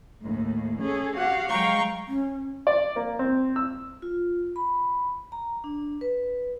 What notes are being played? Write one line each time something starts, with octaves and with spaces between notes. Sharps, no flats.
D#2 A2
C#4 G#4 A4
F#4 G4 F5 F#5
F#3 G#3 F5 G5 A#5 C#6
C#4
D5
A#3
C4
E6
F4
B5
A#5
D4
B4